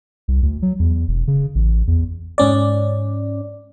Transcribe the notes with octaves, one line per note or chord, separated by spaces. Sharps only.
C2
D2
F#3
E2
E1
C#3
A1
E2
G#2 C#4 D5